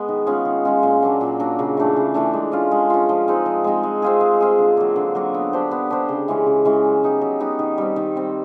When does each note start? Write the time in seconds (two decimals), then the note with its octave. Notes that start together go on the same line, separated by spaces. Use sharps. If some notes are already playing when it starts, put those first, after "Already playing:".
Already playing: G#3 B3
0.08 D#3
0.27 G#3 C#4 F4
0.45 D#3
0.65 G#3 C#4 F4
0.83 A#2
1.02 F#3 A#3 D4
1.21 A#2
1.40 F#3 A#3 D4
1.59 C#3
1.77 E3 A3 D4
1.96 C#3
2.14 E3 A3 D4
2.33 G#3
2.52 C#4 F4
2.71 G#3
2.90 C#4 F4
3.09 F3
3.28 G#3 C4 D#4
3.46 F3
3.64 G#3 C4 D#4
3.83 G#3
4.02 C4 F4 G#4
4.21 G#3
4.40 C4 F4 G#4
4.59 D3
4.77 F#3 A#3
4.96 D3
5.15 F#3 A#3
5.34 B3
5.53 D4 G4 C5
5.71 B3
5.90 D4 G4 C5
6.09 C#3
6.28 E3 G#3 C#4
6.46 C#3
6.65 E3 G#3 C#4
6.84 F#3
7.03 B3 D#4 G4
7.21 F#3
7.40 B3 D#4 G4
7.59 D#3
7.78 G3 C4
7.96 D#3
8.16 G3 C4